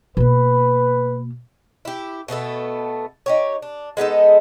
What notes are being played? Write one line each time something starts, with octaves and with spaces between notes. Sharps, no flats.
B2 A#3 B4
E4 G4
B2 A3 B3 A4
D#4 G4 C#5
D4
G#3 B3 D#4 A4